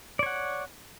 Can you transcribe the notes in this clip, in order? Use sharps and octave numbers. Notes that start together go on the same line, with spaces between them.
C#5 D5 F#5